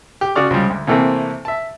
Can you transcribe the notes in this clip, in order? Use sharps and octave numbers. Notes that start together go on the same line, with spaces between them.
G4
C#3 F#4 G#4 D5 F6
C#2 F3 G3
D2
C3 E3 A3 A#3 C4
E5 A5